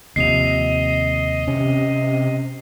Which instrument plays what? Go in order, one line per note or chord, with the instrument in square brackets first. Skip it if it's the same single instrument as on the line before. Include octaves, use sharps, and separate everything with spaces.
[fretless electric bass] D#2 C3 F3 [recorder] D#5 [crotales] C7 F7
[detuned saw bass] C3 [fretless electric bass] C#4